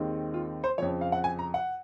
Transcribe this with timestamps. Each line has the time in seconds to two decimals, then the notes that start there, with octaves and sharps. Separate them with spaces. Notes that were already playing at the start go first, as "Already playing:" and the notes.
Already playing: D#2 D#3 G#3 C4 D#4
0.34 F4
0.64 C5
0.78 F2 C#3 F3 C#5
1.01 F5
1.12 F#5
1.24 G#5
1.39 A#5
1.54 F#5